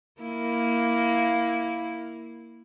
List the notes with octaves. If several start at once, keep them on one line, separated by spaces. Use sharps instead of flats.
A#3 E4